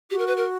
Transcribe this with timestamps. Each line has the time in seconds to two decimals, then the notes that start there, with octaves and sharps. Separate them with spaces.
0.11 F#4 G4
0.19 A#4
0.27 B4
0.37 A#4